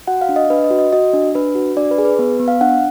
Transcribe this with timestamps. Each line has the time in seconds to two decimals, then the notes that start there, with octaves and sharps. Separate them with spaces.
0.07 F#4 F#5
0.21 F5
0.29 D4
0.36 D#5
0.50 D4 B4
0.64 D#5
0.71 F#4
0.79 D#5
0.93 F#4 D#5
1.13 D4
1.35 D4 B4
1.55 F#4
1.77 D4 D5
1.91 B4
1.98 G#4
2.05 B4
2.19 B3 B4
2.40 B3
2.48 F5
2.61 D4 F#5